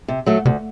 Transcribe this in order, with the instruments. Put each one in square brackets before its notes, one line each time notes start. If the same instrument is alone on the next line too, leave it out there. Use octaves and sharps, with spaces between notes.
[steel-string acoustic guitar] C3
F#3 A3
[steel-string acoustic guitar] D2 [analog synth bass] C3